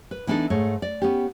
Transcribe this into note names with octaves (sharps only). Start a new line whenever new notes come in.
B4
E3 B3 D4 D#4 A4
G#2 A3 C#5
D5
B3 C#4 G4